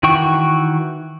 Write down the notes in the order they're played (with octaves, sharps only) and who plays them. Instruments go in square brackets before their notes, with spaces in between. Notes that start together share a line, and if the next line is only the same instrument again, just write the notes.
[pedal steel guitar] D#3 E3 F#4 G5 C#6